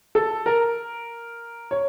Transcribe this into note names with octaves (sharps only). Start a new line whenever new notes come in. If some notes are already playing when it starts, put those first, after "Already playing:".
A4
A#4
C#5